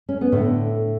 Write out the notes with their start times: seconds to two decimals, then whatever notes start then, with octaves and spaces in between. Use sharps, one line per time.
0.09 C#4
0.21 B3
0.32 A2 D3 A3